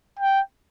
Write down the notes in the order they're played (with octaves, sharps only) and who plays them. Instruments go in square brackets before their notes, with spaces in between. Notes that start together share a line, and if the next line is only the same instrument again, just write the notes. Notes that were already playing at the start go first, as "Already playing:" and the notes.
[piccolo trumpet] G5